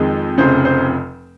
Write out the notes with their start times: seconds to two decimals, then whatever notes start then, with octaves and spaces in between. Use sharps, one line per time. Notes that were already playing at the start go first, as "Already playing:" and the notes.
Already playing: F2 D#3 G#3
0.38 F1 F2 C#3 C5
0.65 C5